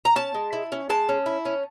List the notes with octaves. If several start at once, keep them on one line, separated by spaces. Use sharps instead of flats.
A#5
C#4 A5
G#3
E4
C#4
G#3 A5
C#4
E4
C#4